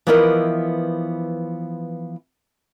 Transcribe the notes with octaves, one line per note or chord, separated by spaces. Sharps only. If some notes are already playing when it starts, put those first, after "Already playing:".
E3 F3 B3 E4 A#4 D#5